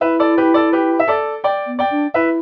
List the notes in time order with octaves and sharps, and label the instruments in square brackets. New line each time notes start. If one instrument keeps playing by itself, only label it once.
[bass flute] E4 [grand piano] B4 E5
[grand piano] A4 D5
G4 B4
A4 D5
G4 B4
E5
A4 D5
D5 G5
[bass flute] B3
[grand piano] D5 G5
[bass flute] D4
[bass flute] E4 [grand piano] B4 E5